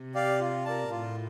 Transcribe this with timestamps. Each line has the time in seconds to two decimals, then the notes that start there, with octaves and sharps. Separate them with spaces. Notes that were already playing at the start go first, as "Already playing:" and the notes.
Already playing: C3
0.15 G4 D5 F5
0.40 F4
0.65 A#4 D5 A5
0.90 A2 F4